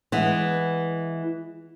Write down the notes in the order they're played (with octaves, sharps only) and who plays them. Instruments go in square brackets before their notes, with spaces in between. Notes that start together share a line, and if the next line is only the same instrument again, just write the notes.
[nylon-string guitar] E3 G#3 B3